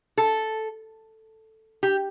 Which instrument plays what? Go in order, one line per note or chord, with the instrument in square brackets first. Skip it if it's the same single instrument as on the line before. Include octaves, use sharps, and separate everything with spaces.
[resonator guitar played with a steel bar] A4
G4